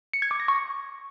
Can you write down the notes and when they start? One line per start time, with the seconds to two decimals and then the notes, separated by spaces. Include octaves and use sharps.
0.13 C#7
0.22 G#6
0.31 D6
0.40 A#6
0.48 C#6